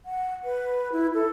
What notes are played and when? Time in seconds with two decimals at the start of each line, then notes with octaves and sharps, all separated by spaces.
0.05 F#5
0.44 B4
0.92 E4
1.14 A4